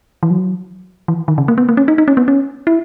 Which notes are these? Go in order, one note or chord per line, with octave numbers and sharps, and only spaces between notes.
E3
F#3
E3
D#3
C#3
A#3
B3
A#3
C#4
D#4
D#4
C#4
B3
C#4
E4